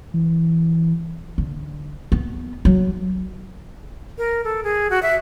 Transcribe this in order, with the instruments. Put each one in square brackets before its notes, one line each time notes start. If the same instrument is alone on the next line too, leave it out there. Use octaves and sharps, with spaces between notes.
[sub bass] E3
[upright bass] D3
B3
F#3
[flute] A#4
A4
G#4
F#4
E5